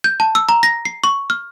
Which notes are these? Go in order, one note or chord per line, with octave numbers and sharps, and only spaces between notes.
G6
A5
E6
A#5
A#6
C7
C#6
F6